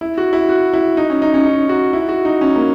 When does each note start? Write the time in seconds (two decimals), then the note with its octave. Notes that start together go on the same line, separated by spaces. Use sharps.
0.01 E4
0.18 F#4
0.33 E4
0.49 F#4
0.73 E4
0.97 D#4
1.10 C#4
1.22 D#4
1.34 C#4
1.45 D#4
1.69 F#4
1.93 E4
2.09 F#4
2.25 D#4
2.41 C#4
2.56 A#3